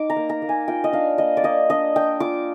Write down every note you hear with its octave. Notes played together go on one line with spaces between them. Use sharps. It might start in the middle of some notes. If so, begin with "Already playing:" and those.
Already playing: D#4 D6
A#5
A#3
A#5
A#3
G#5
F4 G5
D#5
D4 F5
A#3 D#5
D5
A#3 D#5
D4 D#5
D4 G5
F4 D6